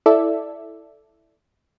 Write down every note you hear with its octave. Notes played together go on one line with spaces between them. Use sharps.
E4 A4 D5 E5